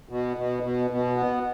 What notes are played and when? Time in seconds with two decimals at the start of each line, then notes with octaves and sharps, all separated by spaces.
0.09 B2
0.37 B2
0.63 B2
0.90 B2
1.17 B3